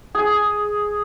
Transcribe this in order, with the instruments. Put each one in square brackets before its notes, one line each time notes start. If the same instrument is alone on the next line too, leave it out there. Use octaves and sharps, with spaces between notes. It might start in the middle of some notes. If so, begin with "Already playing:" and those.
[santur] G#4